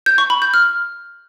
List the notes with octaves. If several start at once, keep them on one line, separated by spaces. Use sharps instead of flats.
G6
C#6
B5
G6
F6